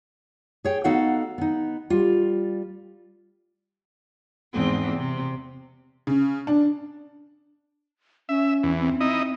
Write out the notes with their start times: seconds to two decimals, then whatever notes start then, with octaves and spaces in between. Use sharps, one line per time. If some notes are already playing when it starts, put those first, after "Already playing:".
0.65 G#4 C#5 G5
0.84 B3 D#4 F#4 A4 F5 F#5
1.38 B3 D#4
1.90 G3 F4
4.53 E2 G#2 C4
4.97 C3
6.07 C#3
6.47 D4
8.29 C#4 E5
8.63 E2
8.80 C4
9.01 C4 D#4 E4 D#5